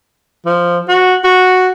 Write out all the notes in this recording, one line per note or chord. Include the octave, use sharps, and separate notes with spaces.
F3
F#4
F#4